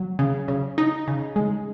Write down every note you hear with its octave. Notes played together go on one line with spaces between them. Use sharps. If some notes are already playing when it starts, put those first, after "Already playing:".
Already playing: F#3
C#3
C#3
D#4
C#3
G#3